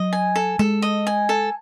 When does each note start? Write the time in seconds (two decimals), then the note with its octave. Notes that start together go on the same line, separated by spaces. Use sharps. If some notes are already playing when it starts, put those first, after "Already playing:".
Already playing: F#3 D#5
0.13 G#5
0.36 A4
0.59 G#3 A4
0.82 D#5
1.07 G#5
1.29 A4